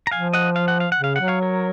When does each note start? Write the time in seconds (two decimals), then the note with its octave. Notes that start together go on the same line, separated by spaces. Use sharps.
0.07 A#5
0.11 F3 F5 G#5
0.33 D#5 F#5
0.56 F5
0.68 F#5
0.80 F5
0.92 F#5
0.99 C#3
1.04 F5
1.16 F#3 F#5
1.28 C#5 F5
1.42 A#4 C#5